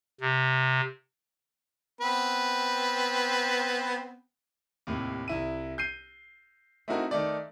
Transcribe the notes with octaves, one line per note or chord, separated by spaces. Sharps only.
C3
B3 C4 B4
D#2 A2 C3
C2 E4 D#7
G6 C7 D#7
A3 C4 D#4 E4 F#4 A#4
D#3 A3 D5